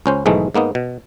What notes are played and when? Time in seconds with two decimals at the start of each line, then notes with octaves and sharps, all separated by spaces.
0.06 C#2 C#4 C5
0.26 B1 G#2 D#3 E3 G#3 A3
0.55 G#2 A#3 B3 D#4
0.75 B2